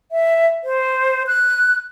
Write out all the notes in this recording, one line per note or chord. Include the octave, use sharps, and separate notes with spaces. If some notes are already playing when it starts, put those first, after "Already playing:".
E5
C5
F#6